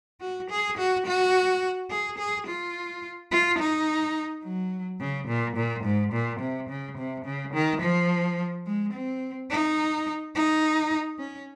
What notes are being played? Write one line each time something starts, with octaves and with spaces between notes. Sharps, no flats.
F#4
G#4
F#4
F#4
G#4
G#4
F4
F4
D#4
F#3
C#3
A#2
A#2
G#2
A#2
C3
C#3
C3
C#3
D#3
F3
G#3
C4
D#4
D#4
C#4